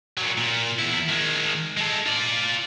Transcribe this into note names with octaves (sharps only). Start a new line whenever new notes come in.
A#2 F#3
A#2
E2 E4
D#3 G#3
G#3 A4
F4 D5